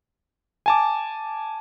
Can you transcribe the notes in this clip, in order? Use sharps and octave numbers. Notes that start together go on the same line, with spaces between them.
G#5 A5 D6